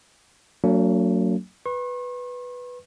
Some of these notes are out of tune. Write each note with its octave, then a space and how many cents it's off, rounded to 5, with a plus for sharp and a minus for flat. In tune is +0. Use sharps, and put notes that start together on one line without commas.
F#3 +0 A#3 -40 D4 -40
B4 +0 C#6 -45